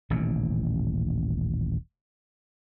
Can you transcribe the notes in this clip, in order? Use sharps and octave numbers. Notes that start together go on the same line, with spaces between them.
D#1 A1 D#2 C3